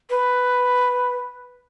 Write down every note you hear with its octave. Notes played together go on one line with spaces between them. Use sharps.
B4